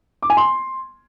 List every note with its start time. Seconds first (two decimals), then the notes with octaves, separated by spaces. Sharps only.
0.22 D6
0.30 G#5
0.37 C6